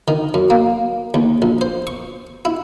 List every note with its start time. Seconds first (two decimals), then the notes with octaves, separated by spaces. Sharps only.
0.08 D#3
0.34 F#2
0.50 A#3
1.14 D#2
1.42 A#1
1.61 C5
1.87 C#6
2.45 E4